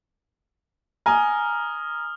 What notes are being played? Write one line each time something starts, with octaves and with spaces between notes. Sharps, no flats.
G#5 A#5 D#6 F6